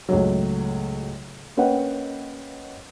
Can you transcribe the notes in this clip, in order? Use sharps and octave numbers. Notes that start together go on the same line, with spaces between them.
C#2 A2 F#3
A#3 C#4 B4 D#5 F#5 G5